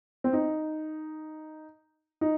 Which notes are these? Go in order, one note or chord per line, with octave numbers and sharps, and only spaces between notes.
C4
D#4
D#4